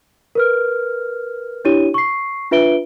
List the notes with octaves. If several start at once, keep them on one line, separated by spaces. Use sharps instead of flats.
A#4 B4 F6
D4 E4 G4 C#5 D#7
C#6 C7
D4 F4 B4 E5 D7 G7